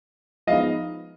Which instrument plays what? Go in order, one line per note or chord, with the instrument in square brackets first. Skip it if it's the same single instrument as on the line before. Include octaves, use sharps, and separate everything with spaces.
[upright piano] F3 G#3 B3 D#4 [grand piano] D#5 F5